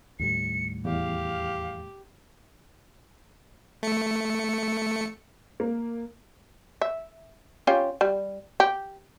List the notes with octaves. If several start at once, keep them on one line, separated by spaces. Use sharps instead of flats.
D#2 A2 G3 C#7
E2 G4 F5
A3 C#7
A#3
E5
C#4 F4 G4
G3
G4